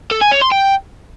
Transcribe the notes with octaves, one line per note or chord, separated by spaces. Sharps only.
A4
G#5
C#5
C6
G5